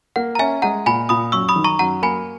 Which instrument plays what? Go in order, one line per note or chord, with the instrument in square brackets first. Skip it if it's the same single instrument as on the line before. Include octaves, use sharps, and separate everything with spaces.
[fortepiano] A#3 [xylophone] F#5
[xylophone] A#5
[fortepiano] C#4 [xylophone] E5 G#5
[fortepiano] G#3 [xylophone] F#5 A#5
[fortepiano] A#2 [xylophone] G#5 B5
[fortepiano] A#2 [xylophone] B5 D#6
[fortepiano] F#2 [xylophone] C#6 E6
[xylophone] B5 D#6
[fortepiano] D#3
[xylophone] A#5 C#6
[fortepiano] F#2 [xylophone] F#5 A#5
[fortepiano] A#3 [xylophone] G#5 B5